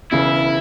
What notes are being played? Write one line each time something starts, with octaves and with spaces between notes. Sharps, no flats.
E1 E2 C#3 E4